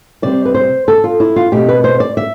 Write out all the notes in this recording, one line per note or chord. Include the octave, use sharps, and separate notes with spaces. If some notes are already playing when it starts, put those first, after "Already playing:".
C3 G3 C4 D5
B4
C5
A4
F4
E4
F4
B2 A3 C4 G4
B4
C5
D5
E5